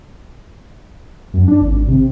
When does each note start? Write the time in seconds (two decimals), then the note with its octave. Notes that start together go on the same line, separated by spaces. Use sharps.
1.34 F#2
1.48 D4
1.62 G#1
1.88 C3